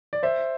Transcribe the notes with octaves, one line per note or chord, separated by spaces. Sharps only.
D5
C5 E5